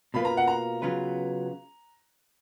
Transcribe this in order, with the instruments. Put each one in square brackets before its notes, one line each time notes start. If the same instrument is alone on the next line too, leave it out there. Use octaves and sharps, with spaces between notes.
[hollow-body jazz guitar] B2 A#3 F4 B4 [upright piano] B5
[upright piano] A#5
F#5
A#5
[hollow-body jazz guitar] C#3 F#3 B3 F4 B4